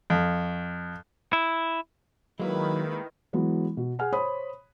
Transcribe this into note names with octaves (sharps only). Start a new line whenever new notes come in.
F2
E4
D#3 F#3 G#3 A#3 E4 B4
E3 F#3 G#3 B3
B2
G#4 F#5 G#5 F6
C5 C#5 B5 D#6